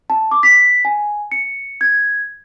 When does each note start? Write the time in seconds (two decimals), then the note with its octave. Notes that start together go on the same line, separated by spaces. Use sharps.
0.10 A5
0.31 D6
0.43 B6
0.85 G#5
1.32 C#7
1.81 G#6